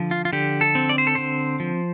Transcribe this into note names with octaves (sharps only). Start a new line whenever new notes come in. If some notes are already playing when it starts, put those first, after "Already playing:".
Already playing: D3 F3
F4
F4
D3 G4
A4
C4
D5
C5
A4
D3 C5
F3